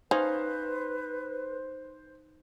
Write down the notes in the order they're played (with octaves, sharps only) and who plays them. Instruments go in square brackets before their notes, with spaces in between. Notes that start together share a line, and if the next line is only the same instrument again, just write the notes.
[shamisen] C#4 [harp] D#4 F5 C#6 [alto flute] B4 [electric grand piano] C5